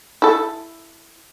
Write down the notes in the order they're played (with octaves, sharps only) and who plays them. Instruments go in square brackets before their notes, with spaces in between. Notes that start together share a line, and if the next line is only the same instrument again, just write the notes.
[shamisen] E4 A4